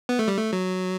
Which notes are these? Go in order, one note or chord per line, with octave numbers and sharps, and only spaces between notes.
B3
A3
G3
A3
F#3